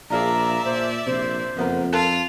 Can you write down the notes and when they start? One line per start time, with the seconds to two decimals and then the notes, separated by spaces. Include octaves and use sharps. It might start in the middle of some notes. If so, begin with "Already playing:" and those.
0.10 A#1 D4 F4 G#4 D5 E5 A#5
0.65 A#2 C5
1.06 A#1 C3 C5
1.57 F#1 F2 B3 A#4
1.93 F4 A4 A5 F#6